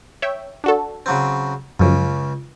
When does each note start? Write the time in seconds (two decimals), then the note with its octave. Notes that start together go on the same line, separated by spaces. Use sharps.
0.22 C#5 E5 G5
0.64 D4 F#4 A4
1.06 C#3 F#3 C4
1.80 C#2 F#2 C#3 F3